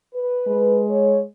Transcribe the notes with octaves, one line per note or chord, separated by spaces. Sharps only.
B4
G#3
C#5